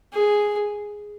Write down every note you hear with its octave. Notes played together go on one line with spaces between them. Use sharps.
G#4